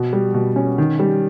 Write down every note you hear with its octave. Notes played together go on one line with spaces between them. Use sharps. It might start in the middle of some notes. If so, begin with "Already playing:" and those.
Already playing: B2
G3
B2
C#4
D#3
G3